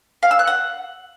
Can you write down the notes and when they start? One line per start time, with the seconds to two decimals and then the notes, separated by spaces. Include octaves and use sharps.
0.23 F5
0.31 E6
0.39 F#6
0.47 F#5